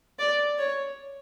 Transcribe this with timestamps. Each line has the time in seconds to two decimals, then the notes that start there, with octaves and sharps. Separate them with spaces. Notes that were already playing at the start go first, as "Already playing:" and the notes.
0.19 D5
0.58 C#5